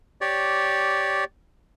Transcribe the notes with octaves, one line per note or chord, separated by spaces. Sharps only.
G4 C#5 D5